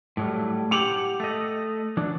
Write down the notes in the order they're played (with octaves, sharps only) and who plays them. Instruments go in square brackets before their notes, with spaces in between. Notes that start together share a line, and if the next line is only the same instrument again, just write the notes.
[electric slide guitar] A2 F#3 G3
[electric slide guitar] G4 F#5 [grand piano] D6 F7 F#7
[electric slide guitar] A3 D#5
E3 F#3 D4